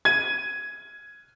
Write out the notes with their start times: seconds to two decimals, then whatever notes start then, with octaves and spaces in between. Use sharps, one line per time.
0.05 G#6 D#7